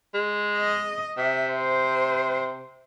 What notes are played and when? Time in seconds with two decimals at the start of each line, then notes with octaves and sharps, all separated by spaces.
0.14 G#3
0.57 D#5
1.17 C3 E5
1.51 C5